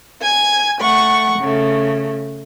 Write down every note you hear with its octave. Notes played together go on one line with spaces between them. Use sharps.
G#5 G#6
A3 F#5 C#6
C#3 A3